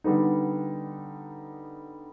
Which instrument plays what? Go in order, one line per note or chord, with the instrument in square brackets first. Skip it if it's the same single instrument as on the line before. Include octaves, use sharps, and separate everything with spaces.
[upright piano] D3 G3 B3 D#4